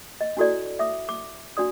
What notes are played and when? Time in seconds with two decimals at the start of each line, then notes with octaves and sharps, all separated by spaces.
0.21 D#5
0.37 D4 E4 F#4 A4 C#5 D5
0.79 E5 D6 D#6
1.09 D6
1.57 D4 F#4 D5 D#6